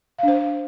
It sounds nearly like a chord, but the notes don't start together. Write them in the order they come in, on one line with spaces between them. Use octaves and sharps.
F5 D4 C5